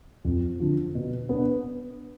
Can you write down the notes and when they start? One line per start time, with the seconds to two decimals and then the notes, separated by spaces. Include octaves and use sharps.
0.25 F2
0.60 D3 F3
0.95 B2
1.29 B3 D4